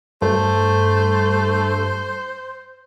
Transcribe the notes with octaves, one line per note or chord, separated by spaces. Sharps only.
G2 A3 C5